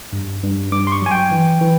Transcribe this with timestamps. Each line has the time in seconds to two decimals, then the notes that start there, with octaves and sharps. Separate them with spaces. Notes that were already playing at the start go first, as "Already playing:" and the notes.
0.13 G2
0.43 G2
0.72 G2 D6
0.87 C6
0.92 C#6
1.02 F#3 G#5
1.11 G5
1.31 E3
1.61 E3